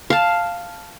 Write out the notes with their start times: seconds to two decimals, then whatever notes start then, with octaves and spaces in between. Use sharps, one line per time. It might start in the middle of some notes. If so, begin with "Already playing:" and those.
0.10 F5 A5